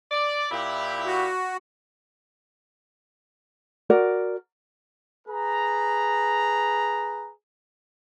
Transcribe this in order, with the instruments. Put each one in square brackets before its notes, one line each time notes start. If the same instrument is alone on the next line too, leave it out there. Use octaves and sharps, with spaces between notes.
[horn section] D5
A#2 E4 G4
[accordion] F#4
[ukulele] F#4 A#4 D5
[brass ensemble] G#4 B4 A#5